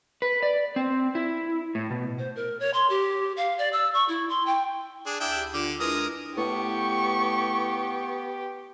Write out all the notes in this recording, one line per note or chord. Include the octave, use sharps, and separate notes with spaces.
B4
D5
C4
E4
A2
B2
C5
A#4
C#5
C6
G4
F5
D5
E6
C#6
E4
C6
G5
D4 G#4
D2 D4 E4 G5 D#6
G4
D3 F4 D6
G#3 D4 E4 A#4 B4 D#6
A2 B3 G4 C#6